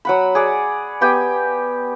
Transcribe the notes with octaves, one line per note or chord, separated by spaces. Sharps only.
F#3 F#5 B5
G#4 D5 F#5
B3 G4 G5 G#5